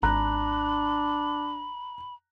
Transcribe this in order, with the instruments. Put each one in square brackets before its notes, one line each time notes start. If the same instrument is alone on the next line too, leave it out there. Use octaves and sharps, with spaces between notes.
[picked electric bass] G#1 [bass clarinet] D4 [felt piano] A#5 F#6 [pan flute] B5